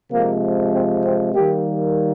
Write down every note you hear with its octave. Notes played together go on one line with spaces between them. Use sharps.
C3 F3 G#3 A#3
C4
C4
D#3 G3 A#3 G4